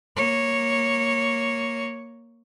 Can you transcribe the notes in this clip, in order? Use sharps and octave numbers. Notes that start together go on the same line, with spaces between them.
A#3 C#5